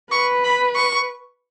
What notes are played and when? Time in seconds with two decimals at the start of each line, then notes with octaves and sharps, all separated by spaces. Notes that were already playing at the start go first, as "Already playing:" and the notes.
0.11 B4 C#6
0.44 B5
0.76 C#6